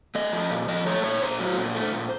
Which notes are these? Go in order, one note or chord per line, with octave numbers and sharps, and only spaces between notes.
A3 D#5
F3
A#2
F3 D#5
A3 C#5
A#2 C#5
A#2 C5
F#3
A#2
A3
A#2